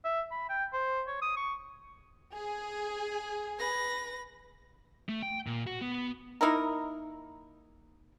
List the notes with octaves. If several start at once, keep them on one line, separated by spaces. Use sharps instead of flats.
E5
B5
G5
C5
C#5
D#6
C#6
G#4
B4 A#6
A3
G5
A#2
F#4
B3
A#3 D#4 E4 A#4